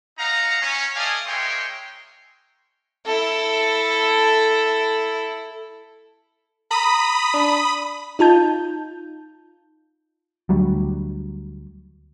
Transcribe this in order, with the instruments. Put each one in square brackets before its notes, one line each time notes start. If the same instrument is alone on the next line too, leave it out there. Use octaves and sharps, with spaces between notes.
[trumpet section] D#4 F5 F#5 A#5
C#4
A3 A4 D5 D#5 F5 G#5
G#3 A#3 C#5 E5 G5 C6
[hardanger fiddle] E4 A4
[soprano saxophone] A#5 [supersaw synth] B5 D#6
[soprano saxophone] D4
[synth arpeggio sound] D#4 F4 A5 G6
[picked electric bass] D2 F#3 G3